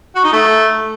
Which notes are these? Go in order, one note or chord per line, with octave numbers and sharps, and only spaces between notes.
F#4
D#4
A3